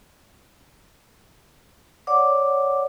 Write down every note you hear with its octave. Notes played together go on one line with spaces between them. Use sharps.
C#5 D5 F#5 D6